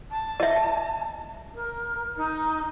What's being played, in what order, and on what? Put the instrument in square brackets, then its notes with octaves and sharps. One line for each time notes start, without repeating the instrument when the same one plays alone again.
[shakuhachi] A5
[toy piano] D#5 E5
[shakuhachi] A#4
D#4